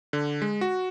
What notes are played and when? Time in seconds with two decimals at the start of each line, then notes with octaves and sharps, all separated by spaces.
0.13 D3
0.42 G#3
0.61 F#4